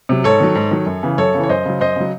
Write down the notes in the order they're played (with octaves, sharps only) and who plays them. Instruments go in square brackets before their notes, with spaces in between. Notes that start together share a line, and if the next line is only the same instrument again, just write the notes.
[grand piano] C3 F#3
G#2 A4 C#5
D#3 F#3
G#2
D#3 F#3
F#2
C#3 E3
F#2 A4 C#5
C#3 E3
C#5
F#2 C5 D#5
C#3 F#3
F#2 C5 D#5
C#3 F#3